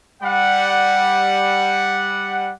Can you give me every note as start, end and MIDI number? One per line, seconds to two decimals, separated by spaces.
0.22 2.52 55
0.22 2.52 78